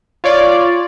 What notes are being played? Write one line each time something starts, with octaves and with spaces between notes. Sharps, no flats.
F4 C#5 D5